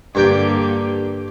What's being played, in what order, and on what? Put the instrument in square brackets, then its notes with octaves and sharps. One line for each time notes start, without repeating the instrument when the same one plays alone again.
[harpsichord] G2 A#4 G5 [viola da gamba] D3 A#3 G4